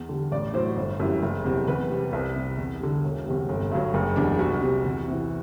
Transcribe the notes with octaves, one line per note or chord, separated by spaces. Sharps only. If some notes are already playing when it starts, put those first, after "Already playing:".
Already playing: E2
D3 G3
A1 D5
A2 F#3 C5
G1
F#2 E3 G3
F#1
E2 C3
E2 B4
C3 G3
C2
C3 G3
E2
D3 G3
E1
E2 C3 G3
G1
G2 F#3
F#1
E2 B2 G3 D4
C2 F#4
C3 G3
E2
C3 E3